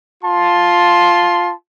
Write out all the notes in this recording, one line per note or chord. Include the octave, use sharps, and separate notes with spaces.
F4 A5 C6